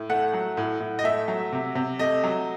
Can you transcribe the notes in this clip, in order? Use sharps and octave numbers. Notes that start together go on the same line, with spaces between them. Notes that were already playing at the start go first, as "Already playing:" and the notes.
Already playing: A2
A3 F#5
F#3
A2
A2
D#5
A3 E5
F#3
C3
C3
A3 D#5
F#3